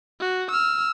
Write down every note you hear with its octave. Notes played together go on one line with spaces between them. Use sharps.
F#4
E6 F6